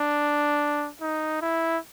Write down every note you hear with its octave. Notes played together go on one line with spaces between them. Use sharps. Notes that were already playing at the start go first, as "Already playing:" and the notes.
Already playing: D4
D#4
E4